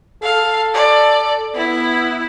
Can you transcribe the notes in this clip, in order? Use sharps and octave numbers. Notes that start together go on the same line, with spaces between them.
A4 F5
D5
B3 E4